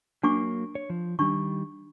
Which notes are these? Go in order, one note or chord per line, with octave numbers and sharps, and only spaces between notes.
F#3 A#3 D4 C#6 D6
C#5
F3
D#3 G3 D4 C#6